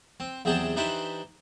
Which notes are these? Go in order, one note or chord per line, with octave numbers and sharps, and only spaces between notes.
C4
E2 C3 F#3 G#4 G5 A5
E3 D4 D#4 G4 B4 C5